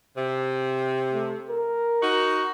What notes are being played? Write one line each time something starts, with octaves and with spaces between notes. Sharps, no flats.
C3
A3
A#4
D#4 F#4